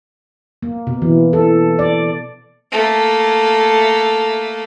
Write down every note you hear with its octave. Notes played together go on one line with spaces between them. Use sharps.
A#3
B2
E3
A4
D5
A3 A#3